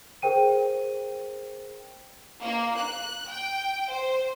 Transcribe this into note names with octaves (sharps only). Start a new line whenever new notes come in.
G#4 A#4 C5 G5 D#7
A#3
F#6
G5
C5